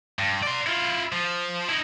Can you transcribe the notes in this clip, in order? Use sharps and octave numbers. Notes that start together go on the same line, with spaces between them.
G2
D5 C6
E4 F4
F3
D#4 E4